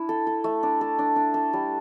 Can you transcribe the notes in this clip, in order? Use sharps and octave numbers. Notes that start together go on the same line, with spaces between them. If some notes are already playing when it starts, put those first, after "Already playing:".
Already playing: D4 E4
A4
A4
A3
D4
A4
D4
D4
A4
G3